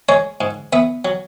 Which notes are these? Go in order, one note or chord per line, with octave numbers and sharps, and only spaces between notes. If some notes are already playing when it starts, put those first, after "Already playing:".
G#3 C#5
G#2
B3 E5
F#3